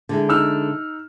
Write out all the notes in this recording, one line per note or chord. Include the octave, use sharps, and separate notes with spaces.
D3 G#3 E4
D#4 E6 F6